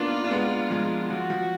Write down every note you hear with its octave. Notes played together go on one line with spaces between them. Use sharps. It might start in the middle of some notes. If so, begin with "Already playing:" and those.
Already playing: A#3 B3 D4 D#4 F4
D4
G#3 B3
F3 G#3
F3 F#4
F3